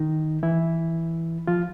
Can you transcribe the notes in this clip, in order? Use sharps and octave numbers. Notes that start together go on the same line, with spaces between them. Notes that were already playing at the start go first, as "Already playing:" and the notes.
Already playing: D#3 D#4
E3 E4
F3 F4